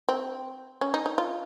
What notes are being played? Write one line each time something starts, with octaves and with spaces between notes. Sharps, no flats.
C4
C#4
D#4
D#4
F4